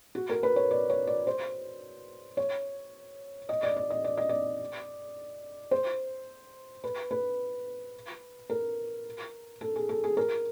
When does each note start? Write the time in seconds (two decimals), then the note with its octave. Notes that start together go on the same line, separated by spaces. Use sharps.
0.15 F#4
0.29 A#4
0.43 B4
0.56 C#5
0.71 D5
0.90 C#5
1.07 D5
1.27 C5
2.37 C#5
3.49 D#5
3.63 D5
3.77 D5
3.90 D#5
4.04 D5
4.17 D#5
4.29 D5
5.71 C5
6.84 B4
7.11 B4
8.50 A#4
9.61 A4
9.76 G#4
9.89 A4
10.04 G#4
10.17 A#4